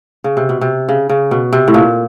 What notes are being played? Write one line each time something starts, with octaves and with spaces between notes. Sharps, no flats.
C#3
C3
B2
C3
C#3
C#3
B2
C3
A2
A#2